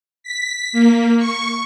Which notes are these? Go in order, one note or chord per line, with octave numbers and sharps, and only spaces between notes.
B6
A#3
C#6